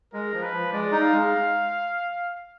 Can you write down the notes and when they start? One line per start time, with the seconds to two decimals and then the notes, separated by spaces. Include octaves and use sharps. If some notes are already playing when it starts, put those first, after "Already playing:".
0.13 G#3 A#4
0.33 F3
0.43 B4
0.53 F3
0.72 G#3 D5
0.92 D#4
1.02 F5
1.12 G#3